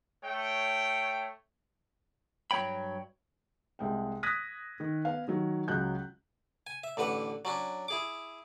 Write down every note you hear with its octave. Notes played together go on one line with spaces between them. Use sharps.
A3 C#5 G5
G2 F#3 A#3 C#5 G5 B5
C2 G#3 G5
D#6 F#6 G#6 A#6 B6 D#7
D#3
B3 F5
D#3 F#3
C#2 F#3 F#6 G6
G#5
E5
A1 D3 B4 F#5
F#3 C#4 D4
E4 G#4 D6